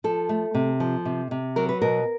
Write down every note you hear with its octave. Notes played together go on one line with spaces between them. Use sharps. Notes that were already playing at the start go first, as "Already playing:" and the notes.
F3 A4
A3
C3
F3
C3
C3
F#3 A#4
B4
B2 A#4